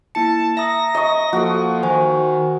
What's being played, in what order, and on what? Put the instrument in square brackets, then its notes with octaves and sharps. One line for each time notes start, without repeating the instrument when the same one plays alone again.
[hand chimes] A#3 E4 C#7 [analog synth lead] A5
[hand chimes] E5 A#5 D#6 [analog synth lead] A#6
[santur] D#5 C#6
[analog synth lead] F3 [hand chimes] A#3 A4 [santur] F#4
[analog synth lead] D#3 [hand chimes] C5 G#5